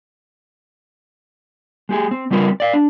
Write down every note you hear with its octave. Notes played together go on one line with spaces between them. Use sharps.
G#3 G4 G#4
C4
C#3 G3 C4 F4 A#4 B4
D5 F5
D4